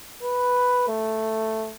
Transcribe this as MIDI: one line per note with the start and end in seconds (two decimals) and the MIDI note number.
0.23 0.88 71
0.88 1.73 57